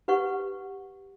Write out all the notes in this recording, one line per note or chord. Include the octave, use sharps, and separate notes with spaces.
G4 B4 F#5 C#6